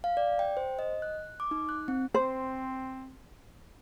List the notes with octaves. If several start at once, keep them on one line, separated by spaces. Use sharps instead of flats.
F5
D5
G5
C5
D#5
F#6
D6
D#4
F#6
C4
C4 C5